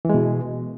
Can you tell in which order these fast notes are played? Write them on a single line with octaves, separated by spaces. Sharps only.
E3 G#3 B2